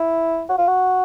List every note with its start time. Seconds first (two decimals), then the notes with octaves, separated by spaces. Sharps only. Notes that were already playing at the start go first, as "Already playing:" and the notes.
Already playing: E4
0.49 F#4
0.58 F4
0.68 F#4